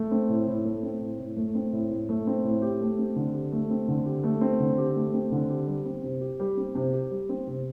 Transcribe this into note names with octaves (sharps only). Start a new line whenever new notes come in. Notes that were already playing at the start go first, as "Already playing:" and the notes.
Already playing: A3
C4
A2
A2
A3
C4
A2
A2
A3
C4
A2
A2
A3
C4
A2
G4
A3
C4
D3
G4
A3
C4
D3
G4
A3
C4
D3
G4
A3
C4
D3
G4
G3
C4
C3
G4
G3
C4
C3
G4
G3
C4
C3